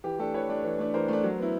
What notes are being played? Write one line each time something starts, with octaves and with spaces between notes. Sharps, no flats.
E3 G4
A3 D4 G4 A4
E3 B4 C#5
A3 D4
E3
A3 D4
E3 A#4 C5
A3 D4
F#3
B3 E4